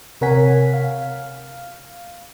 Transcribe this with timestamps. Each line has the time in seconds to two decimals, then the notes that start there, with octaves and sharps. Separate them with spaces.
0.21 C3 A#4 C#5 F#5 G#5 B6
0.73 F5